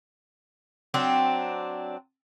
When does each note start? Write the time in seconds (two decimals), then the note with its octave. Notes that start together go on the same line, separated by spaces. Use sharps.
0.94 F#3 C4 D4